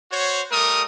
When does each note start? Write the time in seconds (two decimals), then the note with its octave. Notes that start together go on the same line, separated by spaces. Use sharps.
0.11 F#4 C5 C#5
0.51 G3 A3 A#4 D#6